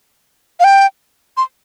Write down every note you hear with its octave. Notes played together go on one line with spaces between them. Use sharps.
F5
G5
C6